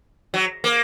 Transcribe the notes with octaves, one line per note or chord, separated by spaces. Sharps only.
F#3
A#3